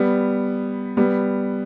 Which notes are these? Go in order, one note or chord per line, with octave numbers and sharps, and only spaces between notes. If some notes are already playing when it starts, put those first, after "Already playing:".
Already playing: G3 B3
G3 B3